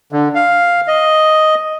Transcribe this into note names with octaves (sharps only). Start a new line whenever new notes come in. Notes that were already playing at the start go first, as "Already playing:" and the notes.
D3
F5
D#5